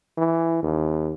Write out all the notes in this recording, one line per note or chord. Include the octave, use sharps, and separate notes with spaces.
E3
D#2